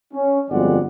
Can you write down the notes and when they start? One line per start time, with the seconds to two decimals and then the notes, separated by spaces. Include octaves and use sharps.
0.13 C#4
0.50 G1 F2 F#3 G#3 D5 F#5